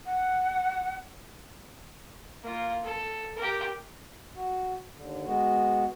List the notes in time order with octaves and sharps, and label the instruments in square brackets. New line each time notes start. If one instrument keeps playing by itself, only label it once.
[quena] F#5
[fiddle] A#3 F4
A4
G4 A#4
[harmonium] F#4
D#2 D3
G#3 B3 F#4